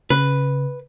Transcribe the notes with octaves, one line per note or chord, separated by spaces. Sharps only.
C#3 B4